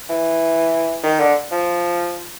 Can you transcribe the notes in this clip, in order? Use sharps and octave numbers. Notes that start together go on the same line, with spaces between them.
E3
D#3
D3
F3